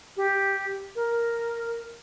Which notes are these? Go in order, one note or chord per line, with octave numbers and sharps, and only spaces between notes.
G4
A#4